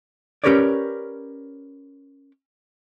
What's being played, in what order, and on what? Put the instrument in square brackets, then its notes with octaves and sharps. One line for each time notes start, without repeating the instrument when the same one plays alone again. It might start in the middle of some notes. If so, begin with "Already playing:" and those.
[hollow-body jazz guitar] C#4 G4 A#4 B4 C#5 D5